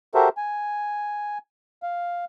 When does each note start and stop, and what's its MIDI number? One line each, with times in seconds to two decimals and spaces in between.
0.15 0.29 66
0.15 0.29 67
0.15 0.29 69
0.15 0.29 70
0.15 0.29 72
0.15 0.29 76
0.37 1.38 80
1.83 2.25 77